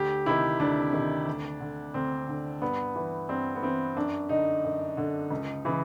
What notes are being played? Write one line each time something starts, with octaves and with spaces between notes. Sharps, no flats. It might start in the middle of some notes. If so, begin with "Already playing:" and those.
Already playing: D2 G4
C3 D#3 E4
D2 D4
C3 D#3
D2
D3
D2 C4
D3
G2 B3
E3
G2 C4
B3
E3 C4
F#2 D4
D3 D#4
F#2
D3
C#2
C#3 E3